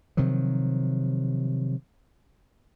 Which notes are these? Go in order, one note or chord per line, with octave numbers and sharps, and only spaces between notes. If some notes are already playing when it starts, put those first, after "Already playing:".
C3 D#3 F3 F#3